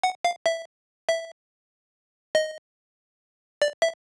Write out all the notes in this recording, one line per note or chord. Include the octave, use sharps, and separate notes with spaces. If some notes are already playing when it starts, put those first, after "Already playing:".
F#5
F5
E5
E5
D#5
D5
E5